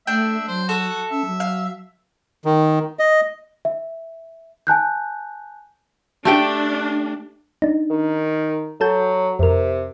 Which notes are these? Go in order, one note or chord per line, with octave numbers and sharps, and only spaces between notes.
A3 D4 E5 G5
F#3 C5
F#4 A4
C#4 E5
F#3
F5
D#3
D#5
E5
G#5 A5 F#6 G6
A3 D4 G4 G5
D4 D#4
D#3
F#3 A4 A5 G6
F2 C3 A#4